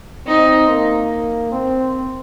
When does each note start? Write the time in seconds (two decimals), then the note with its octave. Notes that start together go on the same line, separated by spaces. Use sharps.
0.26 C4 D#4
0.68 A#3
1.52 C4